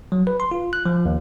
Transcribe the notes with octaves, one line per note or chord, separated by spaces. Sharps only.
F#3
B4
C6
F4
F#6
F3
D#2